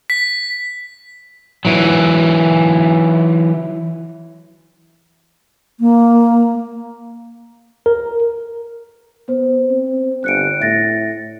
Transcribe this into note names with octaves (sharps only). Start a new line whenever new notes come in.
B6
E3 F#3
A#3
A#4
B3 C5
C4
G1 F#6 C#7 D7
A2 E5 A6 A#6